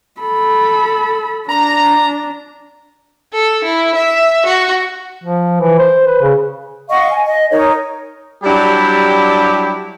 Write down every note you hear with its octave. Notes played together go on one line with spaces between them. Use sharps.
A4 B5
D4 A#5
A4
E4
E5
F#4
F3
E3
C5
B4
C#3
D#5 F5 F#5 C#6
G#5
D#5
D#4 A#4 C#5
F#3 G3 D4 E4 G4